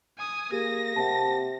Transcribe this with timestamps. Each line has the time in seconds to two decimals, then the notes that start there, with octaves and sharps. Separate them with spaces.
0.18 G#5 D#6
0.52 A#3 G4 G#4 A#6
0.96 C3 F#5 A5